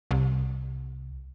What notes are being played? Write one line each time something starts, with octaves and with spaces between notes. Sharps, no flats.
C2